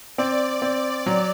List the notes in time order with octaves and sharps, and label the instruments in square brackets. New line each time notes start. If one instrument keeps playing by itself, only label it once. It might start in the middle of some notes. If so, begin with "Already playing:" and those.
[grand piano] C4 [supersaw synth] D5
[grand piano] C4
F#3